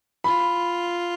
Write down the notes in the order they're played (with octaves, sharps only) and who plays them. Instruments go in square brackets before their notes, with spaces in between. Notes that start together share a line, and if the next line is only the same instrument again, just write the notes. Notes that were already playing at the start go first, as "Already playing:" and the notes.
[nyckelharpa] F4 [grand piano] B5